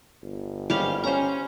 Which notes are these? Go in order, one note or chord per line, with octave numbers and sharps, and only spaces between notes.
G1
G#2 G3 A#3 C#4 G4 F5
C#4 C5 A#5